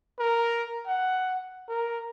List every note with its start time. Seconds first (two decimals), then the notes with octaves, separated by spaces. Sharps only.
0.19 A#4
0.87 F#5
1.69 A#4